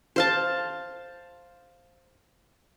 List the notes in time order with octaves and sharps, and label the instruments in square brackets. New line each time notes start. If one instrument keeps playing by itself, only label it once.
[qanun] C5 F5 A5